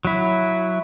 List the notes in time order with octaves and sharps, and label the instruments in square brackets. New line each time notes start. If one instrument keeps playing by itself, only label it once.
[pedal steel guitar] F#3 E4